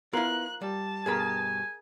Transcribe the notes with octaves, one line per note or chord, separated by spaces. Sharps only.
B3 E4 F4 A#4 C6 F#6
G3 A5
G2 B2 G#4 A#4 G#5 B5